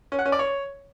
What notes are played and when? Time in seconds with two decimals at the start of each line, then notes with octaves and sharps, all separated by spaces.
0.12 C#4
0.19 F#5
0.26 C#4
0.32 D5
0.39 C#5